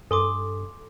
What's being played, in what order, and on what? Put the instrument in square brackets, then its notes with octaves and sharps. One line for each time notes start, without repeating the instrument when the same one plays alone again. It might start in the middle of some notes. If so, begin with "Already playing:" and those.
[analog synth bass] G2 [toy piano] A4 [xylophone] G#5 C6 D6